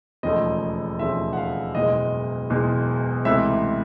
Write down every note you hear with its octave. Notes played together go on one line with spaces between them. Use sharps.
E1 D#2 C#3 F3 A3 D#5
E1 D#2 C#3 F3 A3 E5
F#5
F5
F#1 E2 B2 G#3 D#5
F#1 E2 B2 G#3
C#2 C3 E3 A3 E5